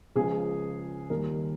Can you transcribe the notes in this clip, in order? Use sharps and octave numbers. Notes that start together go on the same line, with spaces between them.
C#2 C#3 F3 G#4
D#2 D#3 G3 A#4